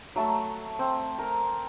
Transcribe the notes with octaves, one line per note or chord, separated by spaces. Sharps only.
F#3 A3 A5
C4
A#4